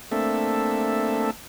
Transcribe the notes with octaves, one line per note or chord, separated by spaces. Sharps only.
A3 A#3 C4 D4 A4 E5